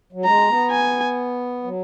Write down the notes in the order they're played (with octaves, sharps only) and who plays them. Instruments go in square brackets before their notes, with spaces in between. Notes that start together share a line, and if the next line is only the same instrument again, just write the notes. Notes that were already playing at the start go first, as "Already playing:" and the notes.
[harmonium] F#3
[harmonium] G#3 [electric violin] A#5
[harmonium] B3
[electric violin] G#5
[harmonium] F#3